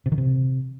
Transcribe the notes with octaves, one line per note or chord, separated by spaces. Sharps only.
C3
D#3
C3